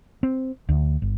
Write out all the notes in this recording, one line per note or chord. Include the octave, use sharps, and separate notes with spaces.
C4
D2
G1